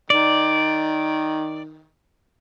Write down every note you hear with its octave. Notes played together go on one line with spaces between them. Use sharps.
D#3 D5